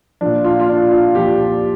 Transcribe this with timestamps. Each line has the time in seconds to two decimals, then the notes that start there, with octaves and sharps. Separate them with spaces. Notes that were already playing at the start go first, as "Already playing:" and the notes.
0.21 A#2 F3 D4
0.45 F4
0.60 F4
0.69 D4
0.92 F4
1.15 A#2 F3 G4